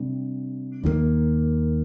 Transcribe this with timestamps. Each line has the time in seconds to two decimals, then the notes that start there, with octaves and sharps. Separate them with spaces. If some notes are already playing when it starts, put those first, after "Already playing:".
Already playing: C3 G3 D4
0.84 D#2 D#3 G3 A#3